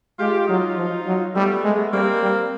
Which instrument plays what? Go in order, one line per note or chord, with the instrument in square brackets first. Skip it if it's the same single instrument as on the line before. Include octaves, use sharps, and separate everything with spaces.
[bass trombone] G#3 [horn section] F4 G4
[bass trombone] F#3 [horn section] D#4 F4
[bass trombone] F3
F#3
[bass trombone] G3 [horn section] A3 B3
[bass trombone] G#3
[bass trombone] G3 [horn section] A#3 C4
[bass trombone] G3